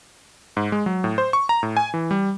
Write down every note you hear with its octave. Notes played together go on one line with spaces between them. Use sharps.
G#2
G#3
F#3
A2
C5
C#6
A#5
A2
G#5
E3
G3